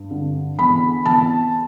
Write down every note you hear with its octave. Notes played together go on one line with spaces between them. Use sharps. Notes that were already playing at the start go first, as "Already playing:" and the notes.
Already playing: G2
D3
E2 B5
E2 A5